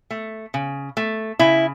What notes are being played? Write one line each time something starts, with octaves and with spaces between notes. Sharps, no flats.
A3
C#3
A3
C#3 E4